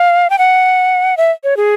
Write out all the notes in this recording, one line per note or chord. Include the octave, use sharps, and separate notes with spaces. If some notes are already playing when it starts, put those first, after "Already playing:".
Already playing: F5
G5
F#5
E5
C#5
G#4